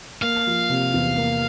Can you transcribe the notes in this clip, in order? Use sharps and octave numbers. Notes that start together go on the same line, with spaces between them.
A#3 F5
F3
C3
E2
A#3